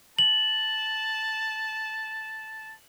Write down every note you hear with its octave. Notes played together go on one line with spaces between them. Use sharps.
A5 F#7